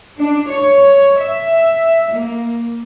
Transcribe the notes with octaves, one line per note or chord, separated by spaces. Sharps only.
D4
C#5
E5
A#3